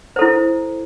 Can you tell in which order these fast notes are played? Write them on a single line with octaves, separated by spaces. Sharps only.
C5 A4 E4